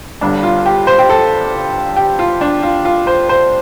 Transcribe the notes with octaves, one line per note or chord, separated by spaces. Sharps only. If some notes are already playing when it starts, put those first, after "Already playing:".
G1 G2 D3 G3 D4
F4
G4
C5
G4
A4
G4
F4
D4
F4
F4
C5
C5